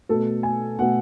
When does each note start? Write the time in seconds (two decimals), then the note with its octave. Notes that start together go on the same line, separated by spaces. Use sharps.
0.09 B2 A3 A4
0.43 G#5
0.79 B2 A3 F#5